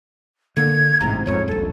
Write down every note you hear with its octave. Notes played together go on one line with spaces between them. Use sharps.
D3 A#3 G#6
A1 G#2 C3 A#5
G#1 F2 G#2 C#5
D#1 A#1 A4